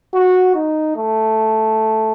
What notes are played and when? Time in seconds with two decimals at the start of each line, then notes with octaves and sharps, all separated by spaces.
0.13 F#4
0.55 D#4
0.96 A3